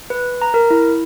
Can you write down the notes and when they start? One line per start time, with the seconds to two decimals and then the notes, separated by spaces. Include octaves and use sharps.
0.10 B4
0.42 A#5
0.54 A#4
0.70 E4